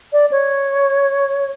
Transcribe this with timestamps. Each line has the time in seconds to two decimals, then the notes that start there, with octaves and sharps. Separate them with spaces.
0.13 D5
0.32 C#5